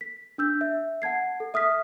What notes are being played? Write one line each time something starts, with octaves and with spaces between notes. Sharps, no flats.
B6
D4 E6 G6
E5
F#5 A5 G#6 C7
A4
E5 D#6 F6 B6